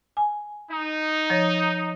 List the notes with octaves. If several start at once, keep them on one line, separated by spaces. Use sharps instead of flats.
G#5
D#4
F3 C#5 A#6